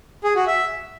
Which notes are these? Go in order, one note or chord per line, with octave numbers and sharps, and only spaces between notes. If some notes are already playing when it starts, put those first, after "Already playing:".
G#4
F#4
E5